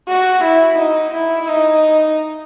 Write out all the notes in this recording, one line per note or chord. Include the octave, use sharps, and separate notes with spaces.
F#4
E4
D#4
E4
D#4